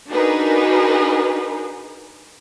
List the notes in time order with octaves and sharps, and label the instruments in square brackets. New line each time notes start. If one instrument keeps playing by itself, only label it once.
[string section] D4 D#4 F#4 G#4 A#4 B4